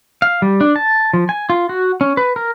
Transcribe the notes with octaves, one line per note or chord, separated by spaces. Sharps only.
F5
G3
D4
A5
F3
G#5
F4
F#4
C#4
B4
A#4